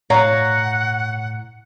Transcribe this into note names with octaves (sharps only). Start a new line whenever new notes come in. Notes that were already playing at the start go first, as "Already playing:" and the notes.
A2 C#5 F5 F#5 A#5